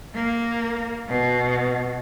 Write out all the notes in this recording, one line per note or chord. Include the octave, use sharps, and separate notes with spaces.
A#3
B2